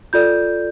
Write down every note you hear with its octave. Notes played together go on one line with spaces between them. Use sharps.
F4 A4 D5 G6